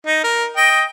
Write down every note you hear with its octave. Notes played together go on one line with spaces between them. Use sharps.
D#4
A#4
D#5 G5